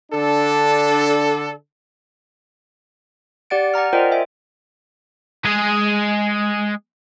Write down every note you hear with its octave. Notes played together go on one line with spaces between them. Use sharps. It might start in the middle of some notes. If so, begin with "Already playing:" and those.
D3 D4 A4
G4 D5 F#5 A6 D7
F#5 G#5 A#5 F6
F4 A#4 C5 D5 D#5 G5
E5 G#5
G#3 G#4